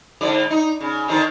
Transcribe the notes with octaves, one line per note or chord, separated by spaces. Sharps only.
G#2 D3 D5
D#4
C#3
D3 D#3 C4